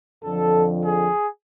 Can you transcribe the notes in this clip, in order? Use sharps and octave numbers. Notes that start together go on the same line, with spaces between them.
F2 D3 F3 A4
G#4